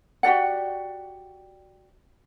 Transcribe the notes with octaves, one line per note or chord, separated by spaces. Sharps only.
F#4 G4 D5 F#5